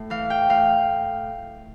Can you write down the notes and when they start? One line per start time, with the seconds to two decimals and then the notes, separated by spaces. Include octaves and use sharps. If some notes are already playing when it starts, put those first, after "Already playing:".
Already playing: A2
0.10 E3 F5
0.30 G5
0.49 A2 F5